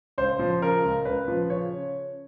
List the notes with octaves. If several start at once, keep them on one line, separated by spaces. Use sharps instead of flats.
C#2 C5
F3
C#3 A#4
C#2
C#2 B4
F3
C#3 C#5